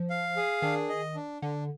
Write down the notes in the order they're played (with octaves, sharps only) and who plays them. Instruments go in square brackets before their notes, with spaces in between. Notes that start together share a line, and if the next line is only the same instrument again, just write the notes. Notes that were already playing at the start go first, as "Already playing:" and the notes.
Already playing: [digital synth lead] F3
[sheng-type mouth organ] F5
G#4
[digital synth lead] D#3 [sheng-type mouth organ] D4
[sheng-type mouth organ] D#5
D4
[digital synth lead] D3 [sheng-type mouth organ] D4